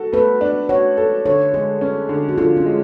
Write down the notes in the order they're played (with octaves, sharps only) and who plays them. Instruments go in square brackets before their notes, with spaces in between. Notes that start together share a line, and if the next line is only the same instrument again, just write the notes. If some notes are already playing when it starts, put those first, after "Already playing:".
Already playing: [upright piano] F#4 A4
[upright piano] A3 [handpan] B4
[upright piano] D4
[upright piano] F#4 [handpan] C#5
[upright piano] A4
[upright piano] D3 [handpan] C#5
[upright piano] G#3 [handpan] G#4
[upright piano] C#4
D3
[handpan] F#4
[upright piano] D3 [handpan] F4
[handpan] C#4
[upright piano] G#3